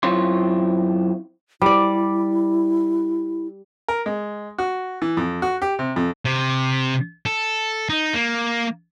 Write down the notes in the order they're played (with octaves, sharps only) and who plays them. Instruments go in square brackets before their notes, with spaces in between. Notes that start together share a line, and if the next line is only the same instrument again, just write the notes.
[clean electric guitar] F#2 C4 E4 F4 C#5 C6
[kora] G3 D5 [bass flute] E4
[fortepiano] A#4
G#3
F#4
E3
F2
F#4
G4
C3
F2
[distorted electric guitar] C3
A4
D#4
A#3